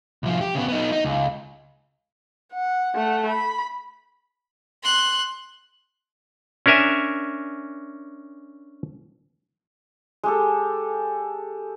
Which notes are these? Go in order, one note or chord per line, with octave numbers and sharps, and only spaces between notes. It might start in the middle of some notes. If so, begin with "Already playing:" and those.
C2 F3
G4
C#3 B3
B3 D#4
D#4
C#2
F#5
A3 F#5
B5
C6 F#6
C#4 D4 A#4 E5 G#5
G#3 G4 A4